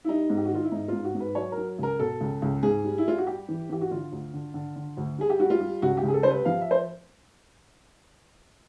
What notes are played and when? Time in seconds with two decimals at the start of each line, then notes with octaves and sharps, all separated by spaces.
0.04 E4
0.08 G3 D#4
0.30 G#2
0.37 G4
0.45 F#4
0.50 D#3 F4
0.64 E4
0.72 G#2 D#4
0.88 G#2 F4
1.04 F#4
1.15 G#2
1.20 B4
1.35 F#3 C#5
1.52 A#4
1.57 F#3
1.78 C#2 A#4
1.99 B2 A4
2.20 C#2
2.42 C#2
2.63 G#2 G#4
2.84 G3
2.98 E4
3.06 G3 F4
3.18 F#4
3.27 G3 G4
3.48 E3
3.69 E3 G4
3.81 F#4
3.91 D3 F4
4.12 D2
4.34 D3
4.54 D3
4.76 D3
4.97 D2
5.18 G3 G#4
5.30 G4
5.39 G3 F#4
5.50 F4
5.60 G3
5.82 C#2 F#4
5.97 G4
6.03 C#2
6.08 G#4
6.14 A4
6.23 G3 C5
6.30 B4
6.45 F3 F5
6.61 E5
6.71 C5